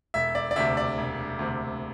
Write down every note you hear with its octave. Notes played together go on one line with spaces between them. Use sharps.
E1 E5
D5
D5
D2 C3 E5
D5
E1
D2 C3